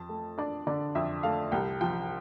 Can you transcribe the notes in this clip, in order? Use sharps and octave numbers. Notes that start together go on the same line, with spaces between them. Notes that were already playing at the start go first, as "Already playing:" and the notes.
Already playing: F2 A5
A3
D4 D5
D3 D5
F2 E5
A3 F5
C2 G5
F3 G5